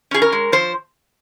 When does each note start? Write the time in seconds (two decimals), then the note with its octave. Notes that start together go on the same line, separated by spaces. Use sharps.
0.11 C#4 G#4
0.22 A#4
0.32 G#3
0.52 F3 C5